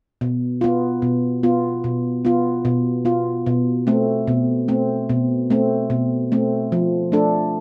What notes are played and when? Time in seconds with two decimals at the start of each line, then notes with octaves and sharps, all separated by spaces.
0.21 B2
0.61 B3 F4
1.02 B2
1.43 B3 F4
1.84 B2
2.25 B3 F4
2.65 B2
3.05 B3 F4
3.46 B2
3.87 A3 C4
4.27 B2
4.68 A3 C4
5.09 B2
5.50 A3 C4
5.90 B2
6.32 A3 C4
6.72 F3
7.12 A3 D4 A4